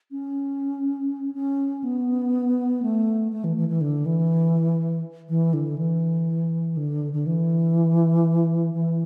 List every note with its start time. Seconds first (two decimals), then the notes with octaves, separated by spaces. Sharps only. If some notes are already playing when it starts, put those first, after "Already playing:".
0.11 C#4
1.34 C#4
1.84 B3
2.82 A3
3.32 A3
3.44 E3
3.57 E3
3.69 E3
3.81 D3
4.05 E3
5.29 E3
5.53 D3
5.78 E3
6.77 D3
7.13 D3
7.26 E3
8.74 E3